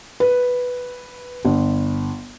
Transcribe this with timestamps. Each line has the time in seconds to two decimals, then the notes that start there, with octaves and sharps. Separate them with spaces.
0.20 B4
1.45 G1